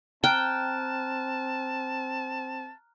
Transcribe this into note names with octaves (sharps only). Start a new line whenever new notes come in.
C4 G5 A5 A#5 F6 F#6